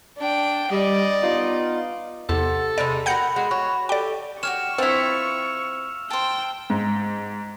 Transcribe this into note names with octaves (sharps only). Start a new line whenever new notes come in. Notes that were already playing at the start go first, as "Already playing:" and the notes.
D4 G5
G3 D5 D#5
B3 D#4 F4
E2 C3 A4 F#5
C3 G#3 D#4 D5 B5
F#4 A#4 F#5 G5 G6 C#7
G#3 F#4
F#4 C#5
G4 A4 D5 G5
F#4 G4 C#5 C#6 F6 E7
C4 E4 F4 E6 F7
C5 G5 A5
G#2